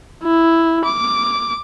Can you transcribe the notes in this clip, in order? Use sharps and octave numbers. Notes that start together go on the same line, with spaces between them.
E4
D6